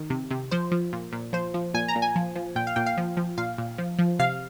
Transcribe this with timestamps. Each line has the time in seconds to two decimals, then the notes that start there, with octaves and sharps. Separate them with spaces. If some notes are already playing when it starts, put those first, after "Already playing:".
Already playing: D#3
0.10 C3
0.31 C3
0.51 F3 C5
0.71 F3
0.93 A#2
1.12 A#2
1.33 F3 C5
1.54 F3
1.74 A#2 G#5
1.88 A#5
1.95 A#2
2.02 G#5
2.16 F3
2.36 F3
2.55 A#2 G5
2.67 F5
2.76 A#2 G5
2.86 F5
2.97 F3
3.17 F3
3.37 A#2 F5
3.58 A#2
3.78 F3
3.99 F3
4.19 C3 F5